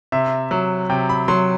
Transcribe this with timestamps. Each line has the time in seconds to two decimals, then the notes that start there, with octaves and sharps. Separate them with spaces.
0.12 C3 E5
0.51 F#3
0.90 C3 G5
1.09 B5
1.28 F#3 C6